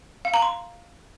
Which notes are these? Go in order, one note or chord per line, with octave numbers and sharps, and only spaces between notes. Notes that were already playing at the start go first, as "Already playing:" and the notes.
F5
A#5
C6